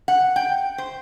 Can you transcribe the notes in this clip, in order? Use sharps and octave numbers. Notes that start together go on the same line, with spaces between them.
F#5
G5
C5